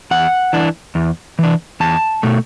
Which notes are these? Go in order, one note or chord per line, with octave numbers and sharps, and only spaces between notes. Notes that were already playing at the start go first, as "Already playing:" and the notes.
E2 F#5
E3 D4
E2
E3 D4
E2 A5
B2 A3